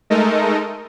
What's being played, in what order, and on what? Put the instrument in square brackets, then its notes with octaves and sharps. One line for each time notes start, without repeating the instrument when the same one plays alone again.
[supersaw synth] G#3 A3 D#4 A4 A#4 D#5